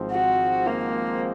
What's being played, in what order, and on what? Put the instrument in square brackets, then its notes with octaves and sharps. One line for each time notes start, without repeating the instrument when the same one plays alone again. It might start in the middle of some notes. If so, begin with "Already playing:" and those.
Already playing: [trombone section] G#1 G#2 F3 C4
[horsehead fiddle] F#4
A#3